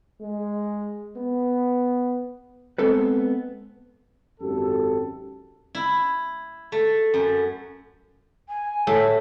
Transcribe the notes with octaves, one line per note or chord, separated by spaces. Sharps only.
G#3
B3
G#3 B3 C4 A4 B4
G#1 F#2 G4 A4
E4
A3
F#2
G#5
A2 A3 E5 G5